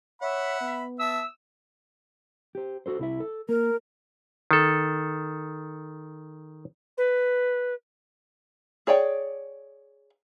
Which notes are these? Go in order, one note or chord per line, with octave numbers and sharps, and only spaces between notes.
C#5 E5 F#5 B5
B3
E5 A5 E6
G4 C5
F#4 A4 C5
C2 E4 E5
A4
A#3 A#4
D#3 A4
B4
G#4 C#5 D5 G5